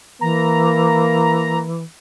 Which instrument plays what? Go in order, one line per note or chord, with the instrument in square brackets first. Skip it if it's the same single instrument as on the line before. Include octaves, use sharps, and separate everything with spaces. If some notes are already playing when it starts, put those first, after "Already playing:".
[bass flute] E3 [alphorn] A#3 [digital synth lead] A#5